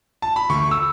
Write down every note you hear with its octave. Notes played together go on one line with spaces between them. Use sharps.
A5
B5
D2 C#6
E6